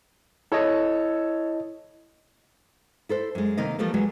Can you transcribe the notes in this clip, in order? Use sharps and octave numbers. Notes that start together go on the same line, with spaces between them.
E4 A4 C#5 D#5
E4 A4 C5
F#2 G#3
C3 D#3 A#3 D#5
E3 F3 G3 A3 A#3
E3 F#3 G#3